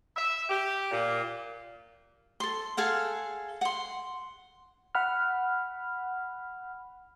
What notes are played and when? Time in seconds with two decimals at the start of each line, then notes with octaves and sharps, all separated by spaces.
0.16 E5
0.50 G4
0.92 A#2
2.40 A4 C6
2.77 G#4 A4 F5 F#5
3.61 F#5 C6
4.95 F#5 B5 F6